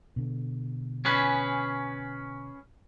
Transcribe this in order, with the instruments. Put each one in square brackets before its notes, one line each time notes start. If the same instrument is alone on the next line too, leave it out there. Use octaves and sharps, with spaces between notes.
[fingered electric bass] B2 D3
[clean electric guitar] C#4 G#4 B4